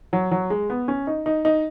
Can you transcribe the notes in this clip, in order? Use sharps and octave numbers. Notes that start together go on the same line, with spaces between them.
F#3
F#3
G#3
B3
C#4
D#4
D#4
D#4